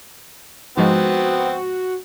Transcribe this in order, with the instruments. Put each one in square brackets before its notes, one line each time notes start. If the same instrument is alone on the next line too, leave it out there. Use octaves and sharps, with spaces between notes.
[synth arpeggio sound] G#2 F3 G#3 [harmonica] B3 C4 [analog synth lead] F#4